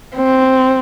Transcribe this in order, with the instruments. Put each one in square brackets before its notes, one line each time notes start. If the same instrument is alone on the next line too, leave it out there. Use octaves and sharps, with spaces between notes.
[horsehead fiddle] C4